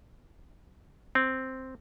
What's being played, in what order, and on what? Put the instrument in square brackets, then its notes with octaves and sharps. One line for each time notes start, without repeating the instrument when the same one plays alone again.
[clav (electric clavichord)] C4